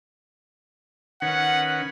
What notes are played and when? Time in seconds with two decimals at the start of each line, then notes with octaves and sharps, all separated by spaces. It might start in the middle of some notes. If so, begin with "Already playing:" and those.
1.22 D#3 C#4 B4 F#5